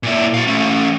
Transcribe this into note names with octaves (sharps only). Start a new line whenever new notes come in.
A#2 E4
F#4 F5
A3 C#4